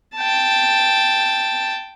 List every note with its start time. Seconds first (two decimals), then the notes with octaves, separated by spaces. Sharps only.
0.16 G5 A5